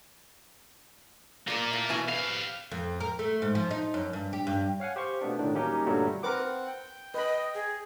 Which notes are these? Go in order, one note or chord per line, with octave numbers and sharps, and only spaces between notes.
A#3 F4 A#4 D5
A2
B2 E3 G#5
G3 B4 F5
F2
A#4
A3
G#2
F3
D#4
F#2
G2
G4
G2
C#5 F5 F#5 G#5
G4 C5 F5 C#6
B2 A3 B3 D4
A2 D3 D#3 D4
F#3 G3 A#3 C#4 D#4 G4
G2 A#2 D3 F#3 G3 A3
C4 A#4 B4 F#5 D6
G5
B4 D#5 B5
G#4